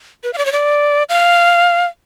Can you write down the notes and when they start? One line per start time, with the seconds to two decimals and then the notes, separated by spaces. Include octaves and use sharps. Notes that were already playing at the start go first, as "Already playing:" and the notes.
0.24 B4
0.33 F5
0.38 D5
0.45 C#5
0.52 D5
1.09 F5